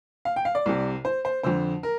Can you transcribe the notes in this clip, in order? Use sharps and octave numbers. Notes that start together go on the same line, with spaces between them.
F5
G5
F5
D5
C2 C3
C5
C5
F2 D3 C5
A#4